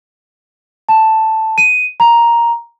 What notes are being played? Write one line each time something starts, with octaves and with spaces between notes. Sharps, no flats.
A5
D#7
A#5